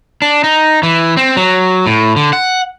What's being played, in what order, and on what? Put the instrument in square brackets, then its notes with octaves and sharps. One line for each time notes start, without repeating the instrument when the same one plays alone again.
[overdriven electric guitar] D4
D#4
E3
C4
F#3
A2
D3
F#5